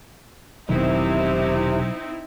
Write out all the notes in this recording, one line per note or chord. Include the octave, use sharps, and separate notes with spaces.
E1 B1 C3 D#3 C4 D#4 E4